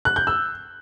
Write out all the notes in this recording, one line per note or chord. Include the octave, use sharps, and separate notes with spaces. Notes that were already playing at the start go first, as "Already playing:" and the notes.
F#6
G6
E6